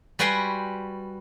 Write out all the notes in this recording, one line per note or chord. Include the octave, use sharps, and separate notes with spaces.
G3 F#4 B4 G5 G#5 C6